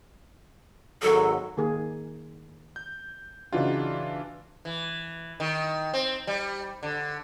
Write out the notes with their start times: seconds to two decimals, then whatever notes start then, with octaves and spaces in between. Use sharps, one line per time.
1.02 G#1 F#3 A4
1.57 D#3 A#3 G#4
2.76 G6
3.53 C#3 E3 D4 D#4 F4 F#4
4.65 E3
5.40 D#3
5.94 C4
6.27 G3
6.83 D3